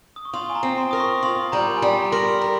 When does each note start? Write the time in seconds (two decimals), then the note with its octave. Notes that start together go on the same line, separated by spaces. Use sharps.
0.16 D#6
0.25 C#6
0.33 F4 C6
0.50 G#5
0.55 A#5
0.63 C4
0.78 C6
0.91 A#4 D#6
1.00 C#6
1.23 F4 C6
1.52 G3 A#5
1.77 G#5
1.82 G3 A#5
2.02 A#5
2.12 A#4 C6
2.34 C6
2.41 A#4 A#5